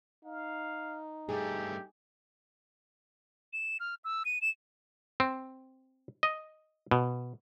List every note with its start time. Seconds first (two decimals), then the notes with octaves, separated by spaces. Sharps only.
0.25 D#4 F5
1.29 G2 A3 G4 G#4
3.53 E7
3.80 F6
4.04 E6
4.25 D#7
4.41 E7
5.20 C4
6.23 D#5
6.91 B2